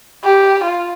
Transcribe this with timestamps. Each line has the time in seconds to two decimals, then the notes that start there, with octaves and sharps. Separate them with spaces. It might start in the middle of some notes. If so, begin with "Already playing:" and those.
0.24 G4
0.64 F4